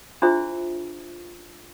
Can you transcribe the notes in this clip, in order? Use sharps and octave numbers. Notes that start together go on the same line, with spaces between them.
D4 E4 F4 G#4 C5 E5